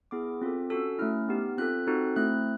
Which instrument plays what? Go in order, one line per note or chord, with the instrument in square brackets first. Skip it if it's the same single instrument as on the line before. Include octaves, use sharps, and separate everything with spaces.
[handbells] B3 E4 G#4 D6
C4 F4 A4
C#4 F#4 A4 E6
A3 C#4 E4 F6
B3 D#4 G4
C4 F4 A4 F#6
C4 D#4 F#4 A4
A3 C4 E4 F#6